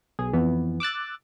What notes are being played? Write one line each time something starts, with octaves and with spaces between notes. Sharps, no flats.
B1 G#4
F2 E3 B3
D6 E6 F#6 A6